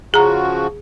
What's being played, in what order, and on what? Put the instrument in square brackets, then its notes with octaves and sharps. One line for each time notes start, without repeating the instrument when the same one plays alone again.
[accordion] C#3 F3 F#4 [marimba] G#4 A#5